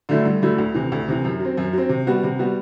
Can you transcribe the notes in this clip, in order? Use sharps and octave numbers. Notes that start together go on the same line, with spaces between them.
D3 F#3 A3 E4
G2
D3 F#3 A3 E4
D2
C3 E3
D2
C3 E3
F#2
F#3 C4
F#2
F#3 C4
C3
G3 B3 F#4
C3
G3 B3 F#4